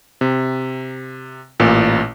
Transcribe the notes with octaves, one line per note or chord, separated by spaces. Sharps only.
C3
A1 A#2